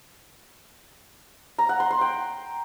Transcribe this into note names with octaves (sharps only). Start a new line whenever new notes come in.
A#5
F#5
C6
C6
G5